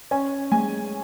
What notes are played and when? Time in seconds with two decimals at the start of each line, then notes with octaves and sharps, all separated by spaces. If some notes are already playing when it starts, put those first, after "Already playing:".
0.11 C#4 G#5
0.51 G#3 G#5